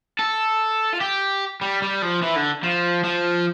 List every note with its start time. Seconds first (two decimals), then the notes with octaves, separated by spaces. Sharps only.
0.19 A4
0.93 F4
1.00 G4
1.61 G3
1.82 G3
2.02 F3
2.22 E3
2.36 D3
2.63 F3
3.04 F3